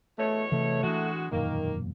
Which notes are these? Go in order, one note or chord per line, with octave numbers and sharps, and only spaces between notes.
E2 B2 A3 C#5
C3 E3 A3
A2 E3 G#3 D4 F#4
E1 F#2 A#2 D#3 A#3